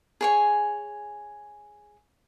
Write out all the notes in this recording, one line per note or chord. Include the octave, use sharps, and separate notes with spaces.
G#4 C#5 G#5